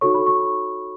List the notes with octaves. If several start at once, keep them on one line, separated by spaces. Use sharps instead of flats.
D#4 F#4 A4 C#5 C#6
B5
C#6